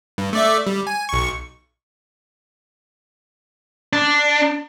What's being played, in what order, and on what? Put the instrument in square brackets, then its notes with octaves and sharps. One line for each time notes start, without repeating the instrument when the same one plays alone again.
[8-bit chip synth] G2
A3 D5 E5
G3
G#5
B1 C#6
[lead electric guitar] D4